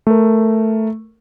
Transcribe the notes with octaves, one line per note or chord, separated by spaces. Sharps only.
A3 A#4